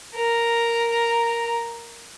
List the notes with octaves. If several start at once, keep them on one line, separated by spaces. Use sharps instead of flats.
A#4 A#5